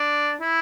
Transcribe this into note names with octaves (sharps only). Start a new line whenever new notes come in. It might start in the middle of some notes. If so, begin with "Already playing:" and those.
Already playing: D4
E4